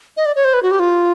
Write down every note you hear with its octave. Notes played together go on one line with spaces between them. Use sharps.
D#5
D5
C#5
C5
B4
F#4
G4
F4